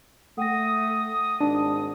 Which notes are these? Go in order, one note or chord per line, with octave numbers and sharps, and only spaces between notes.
A3 F#5 G5 D#6 A#6
G#1 D4